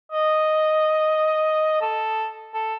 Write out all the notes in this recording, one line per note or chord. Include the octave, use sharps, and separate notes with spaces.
D#5
A4
A4